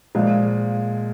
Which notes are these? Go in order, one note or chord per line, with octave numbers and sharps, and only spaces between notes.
A#2 F3 G#3